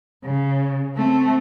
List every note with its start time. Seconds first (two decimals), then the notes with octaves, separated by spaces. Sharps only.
0.25 C#3
0.95 A3 C4